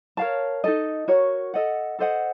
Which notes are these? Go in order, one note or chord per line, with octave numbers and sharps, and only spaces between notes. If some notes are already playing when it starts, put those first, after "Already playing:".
A#4 C#5 F5 A5
D#4 A4 D#5
F#4 A#4 C#5
A4 D#5 F#5
A4 C5 D#5 F#5